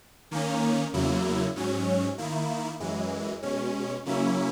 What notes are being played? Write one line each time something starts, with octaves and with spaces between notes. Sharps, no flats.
D#3 A#3 C#4
E2 C#3 F#3 A#3 E4
G#2 F#3 C#4
D#3 A#3 E4
F#2 E3 G#3
B2 G#3 C#4
C#3 F#3 A#3 C#4 E4